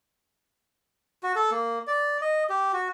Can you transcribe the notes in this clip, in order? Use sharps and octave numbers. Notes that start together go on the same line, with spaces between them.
F#4
A4
A#3
D5
D#5
G4
F#4